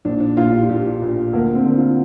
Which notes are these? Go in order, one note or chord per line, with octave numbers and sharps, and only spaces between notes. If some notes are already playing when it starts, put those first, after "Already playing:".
A#1 D4
D4
A#2 F4
G4
F4
A#1 G4
A#2
D2 A#3
C4
D3
F4